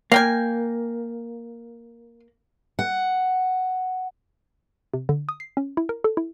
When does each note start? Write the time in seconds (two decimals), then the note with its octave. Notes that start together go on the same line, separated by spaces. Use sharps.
0.12 A#3 F5 G5 G#5
2.79 F#5
4.94 C3
5.09 D3
5.29 D#6
5.40 C7
5.57 C#4
5.77 E4
5.89 A#4
6.04 A4
6.17 E4